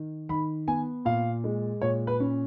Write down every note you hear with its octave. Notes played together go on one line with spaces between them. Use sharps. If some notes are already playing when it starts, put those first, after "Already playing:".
Already playing: D#3
D#3 B5
B3 G#5
A#2 F5
G#3
A#2 C#5
B4
C#4